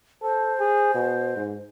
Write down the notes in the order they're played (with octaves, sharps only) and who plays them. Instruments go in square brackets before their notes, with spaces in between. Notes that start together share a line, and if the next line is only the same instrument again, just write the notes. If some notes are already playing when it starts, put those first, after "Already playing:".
[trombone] A4 [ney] C5
[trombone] G#4
B2
G#2